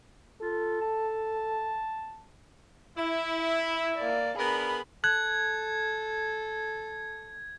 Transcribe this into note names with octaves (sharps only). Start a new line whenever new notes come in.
F4 A4
A5
E4
E5
A#3 D5
B3 D4 G#4 A#4 B5
A4 F#6 G#6